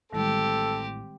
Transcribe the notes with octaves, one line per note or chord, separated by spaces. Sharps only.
A1 A2 D#3 G3 G#3 C4 G4 A4